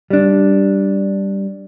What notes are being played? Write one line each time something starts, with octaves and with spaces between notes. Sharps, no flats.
G3 D4